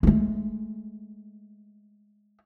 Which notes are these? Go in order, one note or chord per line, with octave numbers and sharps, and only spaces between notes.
G#3 A3